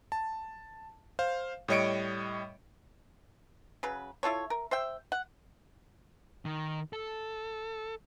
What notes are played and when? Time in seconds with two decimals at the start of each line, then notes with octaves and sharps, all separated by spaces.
0.12 A5
1.19 C5 F5
1.68 A2 G3 C#5 D#5 C#7 D7
3.83 C#3 F#3 B4
4.23 E4 F4 A4 C#5
4.50 A#4
4.71 C5 E5 G5
5.12 F#5
6.45 D#3
6.93 A4